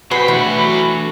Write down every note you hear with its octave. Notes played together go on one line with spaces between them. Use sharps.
F#3 F#4 G#4 B4 C5 G5 B5
E3 A3 D4 A4